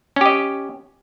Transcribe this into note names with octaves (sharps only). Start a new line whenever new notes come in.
C#4 G4 D#5